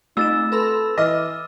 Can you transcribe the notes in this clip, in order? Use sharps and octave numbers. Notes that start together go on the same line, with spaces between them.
A3 C4 D#4 F4 E6 A6 E7
A4 B4 B5 C6
E3 D#5 D6 F6